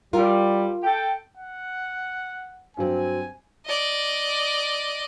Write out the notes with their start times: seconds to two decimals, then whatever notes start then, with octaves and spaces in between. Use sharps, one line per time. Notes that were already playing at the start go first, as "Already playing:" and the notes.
0.13 G3 F4 A#4
0.83 A4 G5
1.37 F#5
2.77 G2 F#3 C4 G#5
3.66 D5 D#5